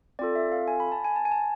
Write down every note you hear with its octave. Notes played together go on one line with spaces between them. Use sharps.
C4 F4 A4 D5
E5
F5
G#5
B5
A5
G#5
A5
G#5
A5